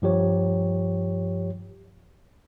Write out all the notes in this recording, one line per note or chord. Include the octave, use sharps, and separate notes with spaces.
G2 F3 G4 C#5